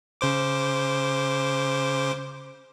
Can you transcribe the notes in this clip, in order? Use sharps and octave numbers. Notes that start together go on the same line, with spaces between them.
C#3 C5 D6